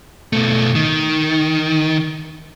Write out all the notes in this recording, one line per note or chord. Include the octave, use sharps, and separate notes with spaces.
B2 A3
D#3